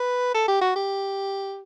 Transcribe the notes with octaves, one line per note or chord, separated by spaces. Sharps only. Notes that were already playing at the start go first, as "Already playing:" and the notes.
Already playing: B4
A4
G4
F#4
G4